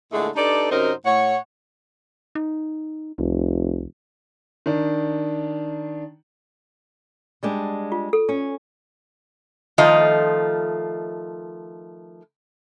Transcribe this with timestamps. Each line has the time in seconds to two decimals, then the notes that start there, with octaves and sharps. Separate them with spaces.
0.12 A#2 D3 G#3 A3 E4 G#4
0.36 D4 D#4 G4 A4 B4 D5
0.71 F#2 C3 F#3 D#4 A#4 C5
1.06 A2 C#5 F#5
2.35 D#4
3.18 F1 C2
4.66 D#3 D4
7.43 G3 G#3 D4
7.92 F4
8.13 A4
8.29 C#4
9.78 D#3 F3 A3 F4 D#5